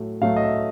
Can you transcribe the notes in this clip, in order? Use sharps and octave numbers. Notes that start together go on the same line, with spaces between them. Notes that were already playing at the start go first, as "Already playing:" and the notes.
Already playing: A2 F#3 A3
A2 F#3 A3 F5
D#5
E5